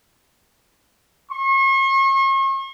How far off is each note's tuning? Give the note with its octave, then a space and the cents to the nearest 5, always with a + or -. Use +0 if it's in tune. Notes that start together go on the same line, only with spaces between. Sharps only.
C#6 -45